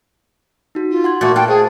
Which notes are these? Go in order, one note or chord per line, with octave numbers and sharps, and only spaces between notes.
D#4 F#4
F4
F#5 C6 G#6
A#2 A3 F#4 A6
F4 A4 G5 F#6
G#4 C5